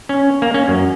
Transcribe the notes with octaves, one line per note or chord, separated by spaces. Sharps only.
C#4
A#3
C#4
F#2